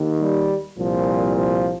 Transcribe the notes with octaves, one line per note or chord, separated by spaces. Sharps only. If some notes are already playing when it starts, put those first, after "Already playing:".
Already playing: D#2 D#3
G3
C2 A#2 F3
F3